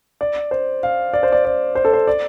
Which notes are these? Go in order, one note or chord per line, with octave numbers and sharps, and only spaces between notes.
D5
C5
F5
D5
C5
D5
D5
C5
A4
C5
D5